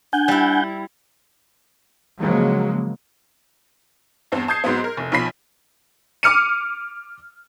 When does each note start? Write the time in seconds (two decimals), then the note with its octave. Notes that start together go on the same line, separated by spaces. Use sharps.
0.13 D4 F#5 G#5 G6
0.28 G3 E4
2.20 C#3 F3 F#3 G#3 A#3
4.32 E2 G2 C4
4.48 A5 D#6 G6 G#6 C7
4.64 G#2 F#3 B3 C4
4.84 A#4
4.97 F1
5.12 B1 F3 B5 B6
6.23 D6 F6 C#7 D#7